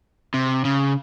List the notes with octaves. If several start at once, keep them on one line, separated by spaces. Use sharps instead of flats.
C3
C#3